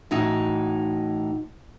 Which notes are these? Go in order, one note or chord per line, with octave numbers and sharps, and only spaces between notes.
A2 E3 D#4 F#4 D#5